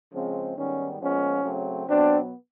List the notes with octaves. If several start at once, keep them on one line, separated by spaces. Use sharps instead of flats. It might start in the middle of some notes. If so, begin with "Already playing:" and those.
C#3 F3 G#3 C4
G#2 D#3 G3 B3 C#4
A#2 F3 G#3 B3 C#4
C#3 F#3 A3 C4
B2 F#3 B3 C4 D4